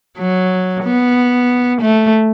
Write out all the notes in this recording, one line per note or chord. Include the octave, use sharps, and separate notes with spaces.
F#3
B3
A3